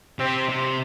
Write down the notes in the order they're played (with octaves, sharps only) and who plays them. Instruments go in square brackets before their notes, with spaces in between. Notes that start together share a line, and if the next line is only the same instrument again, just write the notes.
[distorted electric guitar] C3 [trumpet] C4
[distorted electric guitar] C3